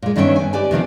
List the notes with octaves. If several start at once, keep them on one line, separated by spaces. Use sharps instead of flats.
A#2 G#3
G2 D#3 B3 C#4 E5 G5
B4 G#5
G4 B4 D5 G#5
C3 D#3 F3 B3